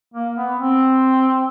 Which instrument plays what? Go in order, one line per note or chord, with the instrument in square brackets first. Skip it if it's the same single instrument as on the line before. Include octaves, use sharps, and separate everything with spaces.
[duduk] A#3
B3
C4